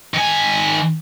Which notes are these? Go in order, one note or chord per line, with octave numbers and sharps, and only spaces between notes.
D#3 G#5